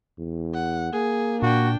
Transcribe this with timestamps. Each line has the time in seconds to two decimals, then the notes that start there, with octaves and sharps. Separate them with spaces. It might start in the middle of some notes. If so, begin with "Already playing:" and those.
0.19 E2
0.55 F#5
0.93 A#3 G#4
1.42 A#2 D4 F#4 G5